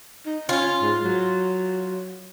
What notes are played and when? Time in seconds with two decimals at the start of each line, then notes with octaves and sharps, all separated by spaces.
0.26 D#4
0.49 C#4 F4
0.81 G#2
1.04 F#3